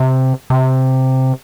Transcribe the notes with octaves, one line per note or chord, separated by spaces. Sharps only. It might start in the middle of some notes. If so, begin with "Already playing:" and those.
Already playing: C3
C3